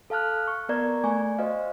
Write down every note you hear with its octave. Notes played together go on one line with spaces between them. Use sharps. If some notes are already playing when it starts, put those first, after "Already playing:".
A4 F5 A5 F6 F#6
C#6
B3 A#4 D5 A#5 G#6
A3 D5 G#5 C#6
F#4 C5 D#5 F5